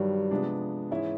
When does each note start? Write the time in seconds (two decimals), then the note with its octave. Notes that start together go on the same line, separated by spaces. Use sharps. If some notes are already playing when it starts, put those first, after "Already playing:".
Already playing: G2 D#3 F#3 G3
0.31 C3 F3 G#3 B3 D4
0.91 G#2 E3 G#3 C#4 E4